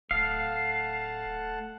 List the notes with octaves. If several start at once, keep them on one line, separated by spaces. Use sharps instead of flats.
D1 A3 F5 F#5 A5